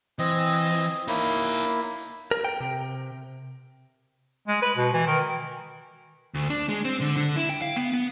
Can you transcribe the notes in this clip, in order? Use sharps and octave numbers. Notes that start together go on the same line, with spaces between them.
E3 C4 D#5
A#3 D#4 E4 C#5
A#4
G5
C3
G#3
B4
B2
E3
D#3
D2
D4
G#3
C4
D3
D3
E4
G5
F5
B3
B3